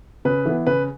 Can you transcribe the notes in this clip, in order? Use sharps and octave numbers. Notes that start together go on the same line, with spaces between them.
C#3 B4
E3 B3
C#3 B4